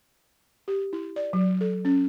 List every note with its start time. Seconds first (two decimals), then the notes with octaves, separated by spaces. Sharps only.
0.68 G4
0.93 E4
1.16 D5
1.33 F#3
1.61 A4
1.85 C#4